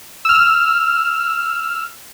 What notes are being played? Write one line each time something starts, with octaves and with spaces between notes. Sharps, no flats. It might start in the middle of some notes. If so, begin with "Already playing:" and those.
E6 F6